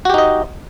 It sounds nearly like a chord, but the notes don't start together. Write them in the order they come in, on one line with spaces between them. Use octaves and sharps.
F#4 G4 D#4 D#5